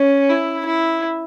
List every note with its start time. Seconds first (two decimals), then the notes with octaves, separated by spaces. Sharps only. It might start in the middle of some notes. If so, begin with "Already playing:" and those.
Already playing: C#4
0.29 E4
0.66 E4